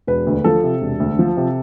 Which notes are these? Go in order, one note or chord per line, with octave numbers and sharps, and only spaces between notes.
E1 B4
D2
F3 A4
C3
E1
D2
F3
C3